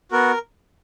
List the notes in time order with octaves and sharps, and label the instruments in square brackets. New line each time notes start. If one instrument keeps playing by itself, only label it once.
[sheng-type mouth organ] B3 F#4 A#4